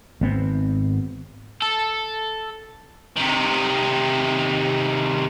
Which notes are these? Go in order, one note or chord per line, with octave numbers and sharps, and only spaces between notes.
G#1 B3 C4
A4
C3 D#3